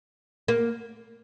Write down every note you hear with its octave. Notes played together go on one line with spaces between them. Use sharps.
A#3